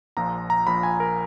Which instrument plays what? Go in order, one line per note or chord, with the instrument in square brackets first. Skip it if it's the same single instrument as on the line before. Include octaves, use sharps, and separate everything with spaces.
[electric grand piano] A#1 A#2 F3 A#5
A#5
A#1 A#2 F3 B5
G#5
A#4